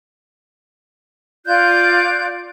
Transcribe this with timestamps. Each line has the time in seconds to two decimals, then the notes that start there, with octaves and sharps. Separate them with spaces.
1.46 F4 D5 F#6 G6